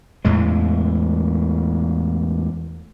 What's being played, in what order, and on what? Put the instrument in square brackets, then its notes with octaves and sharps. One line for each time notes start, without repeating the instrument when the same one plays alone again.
[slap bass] E2 A2 G#3